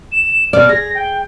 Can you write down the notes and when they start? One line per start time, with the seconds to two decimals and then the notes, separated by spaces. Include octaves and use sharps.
0.12 E7
0.53 B2 D5 F6
0.69 G#4 A#6
0.95 G5